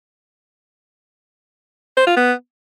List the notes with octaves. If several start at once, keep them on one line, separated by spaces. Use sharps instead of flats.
C5
F4
B3